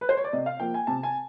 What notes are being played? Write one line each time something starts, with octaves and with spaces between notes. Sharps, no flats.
B4
C5
C#5
D5
C3 D#5
F5
F3 A#3 G5
G#5
C3 A5
G#5